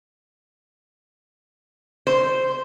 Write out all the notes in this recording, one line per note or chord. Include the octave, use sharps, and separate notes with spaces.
C5